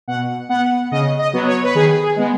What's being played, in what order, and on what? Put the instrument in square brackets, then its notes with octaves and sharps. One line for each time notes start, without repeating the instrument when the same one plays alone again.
[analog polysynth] B2 F#5
B3 F#5
C#3 D#5
D#5
F#3 B3
C#5
B4
D#3 G#4
G#4
G#3 B3